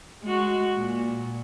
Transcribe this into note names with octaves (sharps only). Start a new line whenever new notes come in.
G#3 F#4
A#2